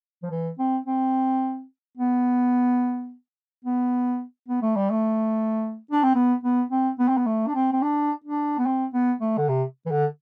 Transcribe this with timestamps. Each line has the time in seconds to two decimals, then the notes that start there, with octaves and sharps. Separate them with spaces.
0.23 F3
0.31 E3
0.59 C4
0.86 C4
1.97 B3
3.64 B3
4.48 B3
4.62 A3
4.76 G3
4.90 A3
5.91 D4
6.03 C4
6.15 B3
6.43 B3
6.71 C4
6.99 B3
7.08 C4
7.17 B3
7.26 A3
7.47 D4
7.55 C4
7.72 C4
7.82 D4
8.24 D4
8.58 B3
8.66 C4
8.94 B3
9.21 A3
9.38 D3
9.49 C3
9.86 E3
9.91 D3